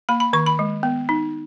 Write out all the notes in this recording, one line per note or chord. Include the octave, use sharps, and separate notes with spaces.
A#3 B5
B5
D#3 C#6
B5
G#3
B3
D#4